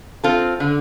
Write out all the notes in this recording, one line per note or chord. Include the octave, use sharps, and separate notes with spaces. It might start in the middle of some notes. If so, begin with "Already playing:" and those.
C4 F4 A4
D3